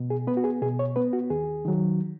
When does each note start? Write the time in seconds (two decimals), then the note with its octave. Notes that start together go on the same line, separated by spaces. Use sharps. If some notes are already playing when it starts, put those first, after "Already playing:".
Already playing: B2
0.10 G#4
0.27 B3 B4
0.37 F#4
0.44 G#4
0.62 B2 G#4
0.79 C#5
0.96 B3 B4
1.13 F#4
1.30 D#2 G#4
1.65 D#3 F#3